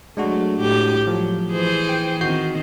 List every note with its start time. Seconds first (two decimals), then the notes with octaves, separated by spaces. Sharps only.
0.17 F#3 G#3 A3 D4 F#4
0.60 A2 G4
1.07 F3 F#3
1.51 E3 G#4 C5
1.89 G5
2.21 D#3 C4 F#4 G6 C7